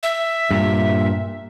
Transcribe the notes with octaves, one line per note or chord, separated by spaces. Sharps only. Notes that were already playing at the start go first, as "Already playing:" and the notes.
E5
G2 A#2